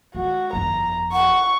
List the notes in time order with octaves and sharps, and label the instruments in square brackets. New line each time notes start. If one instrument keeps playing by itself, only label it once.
[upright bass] G#3 [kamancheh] F#4
[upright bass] G1 F2 [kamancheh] A#5
[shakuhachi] F#5 [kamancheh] C#6